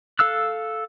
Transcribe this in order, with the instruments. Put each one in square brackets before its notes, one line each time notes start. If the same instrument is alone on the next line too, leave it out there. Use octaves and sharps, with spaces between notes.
[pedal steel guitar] A4 F5 E6 F#6